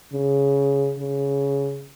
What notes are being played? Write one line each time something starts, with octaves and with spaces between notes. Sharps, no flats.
C#3
C#3